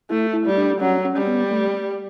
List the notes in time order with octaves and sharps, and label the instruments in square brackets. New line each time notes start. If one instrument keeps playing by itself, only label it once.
[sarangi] A3 [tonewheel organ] E4
[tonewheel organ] E4
[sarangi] G3
[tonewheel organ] D4
[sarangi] F#3 [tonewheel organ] C#4
[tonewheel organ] C#4
[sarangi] G3
[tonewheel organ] B3
A3